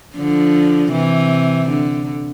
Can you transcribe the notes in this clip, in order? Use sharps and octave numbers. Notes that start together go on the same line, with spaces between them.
D3 F3
C3 E3
D3